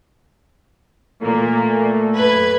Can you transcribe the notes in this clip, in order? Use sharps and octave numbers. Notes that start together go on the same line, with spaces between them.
A#2 A3 A#3
F#2 B4 G#6